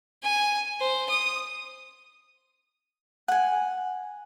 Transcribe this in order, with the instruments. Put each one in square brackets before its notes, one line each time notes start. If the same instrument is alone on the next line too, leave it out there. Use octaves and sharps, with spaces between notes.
[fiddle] G#5
C5
D#6
[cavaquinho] F#5 G#5